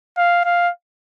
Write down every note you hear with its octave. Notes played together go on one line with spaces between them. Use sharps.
F5
F5